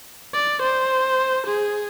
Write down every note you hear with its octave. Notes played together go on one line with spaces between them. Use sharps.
D5
C5
G#4